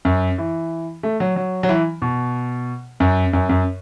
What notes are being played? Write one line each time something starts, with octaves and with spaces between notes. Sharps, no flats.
F#2
E3
A3
F#3
F#3
F#3
E3
B2
F#2
F#2
F#2